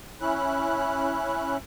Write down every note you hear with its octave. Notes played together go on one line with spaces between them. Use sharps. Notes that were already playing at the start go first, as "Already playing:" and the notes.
C#4 E4 F#6